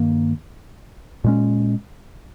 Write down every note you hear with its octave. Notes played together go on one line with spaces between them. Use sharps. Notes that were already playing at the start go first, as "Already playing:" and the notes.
Already playing: G2 D#3 A#3
A#2 G#3 C#4